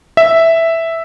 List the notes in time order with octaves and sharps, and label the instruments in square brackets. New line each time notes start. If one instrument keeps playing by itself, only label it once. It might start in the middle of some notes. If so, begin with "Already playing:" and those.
[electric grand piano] E5